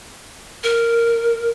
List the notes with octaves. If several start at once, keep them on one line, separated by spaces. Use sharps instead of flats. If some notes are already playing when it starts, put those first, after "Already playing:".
A#4